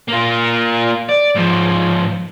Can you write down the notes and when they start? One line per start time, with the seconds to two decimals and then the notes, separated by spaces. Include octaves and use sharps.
0.09 A#3 F4
1.09 D5
1.35 G#2 F3